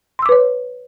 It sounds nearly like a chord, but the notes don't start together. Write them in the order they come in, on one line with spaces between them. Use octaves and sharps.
C6 E6 D6 B4 C#5